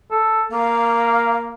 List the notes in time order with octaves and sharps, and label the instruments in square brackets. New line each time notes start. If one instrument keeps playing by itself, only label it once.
[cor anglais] A4
[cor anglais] A#3 [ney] F5